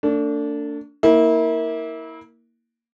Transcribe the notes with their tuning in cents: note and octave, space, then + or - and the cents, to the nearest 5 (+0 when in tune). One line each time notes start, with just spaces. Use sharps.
A3 +40 D4 -20
A#3 +0 E4 -30